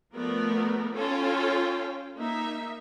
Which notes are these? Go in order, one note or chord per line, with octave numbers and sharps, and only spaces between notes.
F3 A3 B3 A#4 D5
C#4 F4 A4 C#5 F5 G5
A#3 D#4 E5